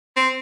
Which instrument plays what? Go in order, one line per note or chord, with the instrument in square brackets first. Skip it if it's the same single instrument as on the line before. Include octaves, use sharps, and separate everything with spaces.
[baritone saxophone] C4